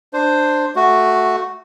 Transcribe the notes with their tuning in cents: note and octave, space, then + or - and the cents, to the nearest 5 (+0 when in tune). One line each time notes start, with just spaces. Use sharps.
D4 +15 C5 +0
A3 +0 F#4 +0